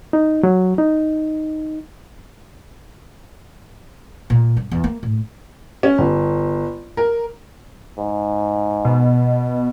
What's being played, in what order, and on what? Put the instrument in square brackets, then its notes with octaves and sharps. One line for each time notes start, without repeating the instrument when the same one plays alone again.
[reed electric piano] D#4
F#3
D#4
[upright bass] A#2
G2
E2
A#3
A2
[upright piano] C#4
G1
A#4
[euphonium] G#2
[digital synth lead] B2